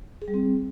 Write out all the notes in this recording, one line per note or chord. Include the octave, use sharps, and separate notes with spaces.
G#4
G3
C4